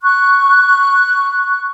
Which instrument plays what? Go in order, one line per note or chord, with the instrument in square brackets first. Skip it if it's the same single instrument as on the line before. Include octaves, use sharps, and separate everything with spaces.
[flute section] C#6 F#6